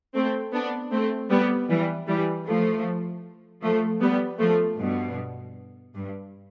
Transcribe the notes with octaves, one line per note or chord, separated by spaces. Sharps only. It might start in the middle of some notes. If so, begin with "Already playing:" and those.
A3 C4
B3 D4
A3 C4
G3 B3
E3 G3
E3 G3
F3 A3
F3 A3
G3 B3
F3 A3
G2 B2
G2